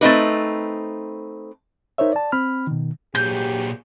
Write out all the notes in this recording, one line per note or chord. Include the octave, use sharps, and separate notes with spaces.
A3 C4 D#4 B4
D#4 A#4 C5 C#5 E5
D5 A5
C4 B5 F6
B2 D#3
G2 A#2 F#3 G4 G#4 G6